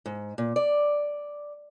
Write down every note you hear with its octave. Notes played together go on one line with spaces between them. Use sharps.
G#2
A#2
D5